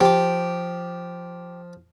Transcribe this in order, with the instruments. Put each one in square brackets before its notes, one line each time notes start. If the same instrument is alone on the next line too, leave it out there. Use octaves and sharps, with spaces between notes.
[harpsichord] F3 [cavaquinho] G4 D6